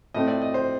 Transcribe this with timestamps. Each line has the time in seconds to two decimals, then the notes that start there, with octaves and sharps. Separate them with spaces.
0.14 A2 A3 C4 D#5
0.28 D5
0.42 D#5
0.54 C5